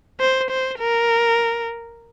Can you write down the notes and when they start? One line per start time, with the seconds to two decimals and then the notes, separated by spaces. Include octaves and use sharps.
0.20 C5
0.51 C5
0.80 A#4